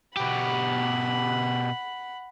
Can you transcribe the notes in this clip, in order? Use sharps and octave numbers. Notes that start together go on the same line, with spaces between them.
B2 G4 F#5 B5